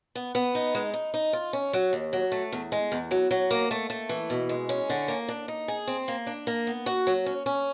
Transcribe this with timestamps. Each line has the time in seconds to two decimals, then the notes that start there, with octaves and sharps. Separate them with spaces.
0.15 B3
0.35 B3
0.55 D#4
0.75 G#3
0.94 D#4
1.14 D#4
1.33 F4
1.53 C#4
1.73 F#3
1.93 D#2
2.13 F#3
2.32 A3
2.52 E2
2.72 G#3
2.92 E2
3.11 F#3
3.31 F#3
3.51 A#3
3.71 A3
3.90 A3
4.09 E3
4.30 B2
4.49 G#3
4.69 C#4
4.90 D3
5.08 A#3
5.28 D4
5.48 D#4
5.68 G#4
5.87 C4
6.08 A#3
6.27 D4
6.47 A#3
6.67 B3
6.86 F#4
7.07 F#3
7.26 C#4
7.46 C#4